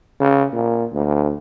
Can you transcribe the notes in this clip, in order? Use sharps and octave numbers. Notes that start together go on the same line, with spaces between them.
C#3
A#2
D2